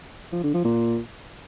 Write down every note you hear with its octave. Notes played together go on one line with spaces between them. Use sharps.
F3
D3
F3
A#2